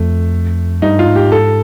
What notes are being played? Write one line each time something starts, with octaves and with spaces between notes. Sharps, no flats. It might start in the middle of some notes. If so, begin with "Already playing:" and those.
Already playing: F2 A3
G2 D#4
F4
G#2
G4
A4